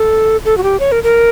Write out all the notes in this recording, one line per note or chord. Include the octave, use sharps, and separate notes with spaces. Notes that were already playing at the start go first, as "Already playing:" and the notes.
Already playing: A4
A4
F#4
G4
C#5
A#4
A#4